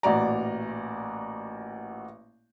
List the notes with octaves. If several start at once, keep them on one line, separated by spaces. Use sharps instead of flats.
A1 A#2 F#4 D5 A#5